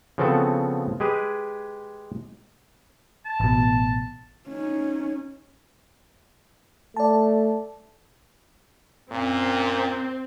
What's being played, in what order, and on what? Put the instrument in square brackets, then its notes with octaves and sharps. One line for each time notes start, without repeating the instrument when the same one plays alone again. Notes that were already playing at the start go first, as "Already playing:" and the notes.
[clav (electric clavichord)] C#3 F3 B3 C4 F#4 A4
G#3 G4 G#4 B4
[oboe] A5
[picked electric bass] A1 B2
[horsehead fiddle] C#4 D#4
[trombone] A3 [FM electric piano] D5 A5
[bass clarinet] F#2 [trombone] A#2 [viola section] C4